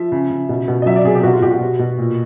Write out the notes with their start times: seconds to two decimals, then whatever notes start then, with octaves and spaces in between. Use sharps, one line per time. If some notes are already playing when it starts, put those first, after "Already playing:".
Already playing: F3 E5
0.12 C#3
0.31 C#3
0.49 B2
0.68 B2
0.82 D#5
0.86 F#3 E5
0.96 D5
1.04 C3 G#4
1.15 G4
1.23 B2 F#4
1.33 F4
1.42 B2 G4
1.51 F#4
1.60 B2
1.79 B2
1.98 A#2